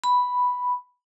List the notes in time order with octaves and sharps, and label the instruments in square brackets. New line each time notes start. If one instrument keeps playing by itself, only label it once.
[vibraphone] B5